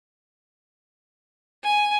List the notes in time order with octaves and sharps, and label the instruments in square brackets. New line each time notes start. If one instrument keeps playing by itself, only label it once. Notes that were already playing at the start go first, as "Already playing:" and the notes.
[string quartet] G#5